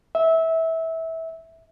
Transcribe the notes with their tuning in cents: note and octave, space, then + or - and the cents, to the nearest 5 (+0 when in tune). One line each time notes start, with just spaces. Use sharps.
E5 -20